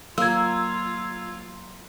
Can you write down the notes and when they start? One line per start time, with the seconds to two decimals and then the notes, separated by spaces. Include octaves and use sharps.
0.18 F#3 A#3 F4 C6 E6 G#6